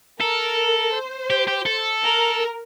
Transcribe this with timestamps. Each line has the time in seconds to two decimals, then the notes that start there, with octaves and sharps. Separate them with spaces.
0.20 A4 A#4
0.93 C5
1.30 G4
1.48 G4
1.66 A4
2.04 A#4